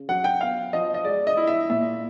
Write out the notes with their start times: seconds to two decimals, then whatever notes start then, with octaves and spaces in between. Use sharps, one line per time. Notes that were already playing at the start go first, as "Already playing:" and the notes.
Already playing: C#3
0.09 F#3 F#5
0.24 G5
0.41 B3 F5
0.73 F3 D#5
0.94 D#5
1.05 G#3 D5
1.27 D#5
1.37 E4
1.47 E5
1.70 A#2 E5